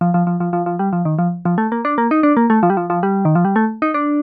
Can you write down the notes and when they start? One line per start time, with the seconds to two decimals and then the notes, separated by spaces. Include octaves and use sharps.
0.01 F3
0.14 F3
0.27 F3
0.40 F3
0.53 F3
0.66 F3
0.79 G3
0.93 F3
1.05 D#3
1.19 F3
1.45 F3
1.58 A3
1.72 A#3
1.85 D4
1.98 A#3
2.11 D#4
2.23 D4
2.37 A#3
2.50 A3
2.63 F3
2.70 G3
2.77 F3
2.90 F3
3.03 G3
3.25 D#3
3.35 F3
3.45 G3
3.56 A3
3.82 D#4
3.94 D4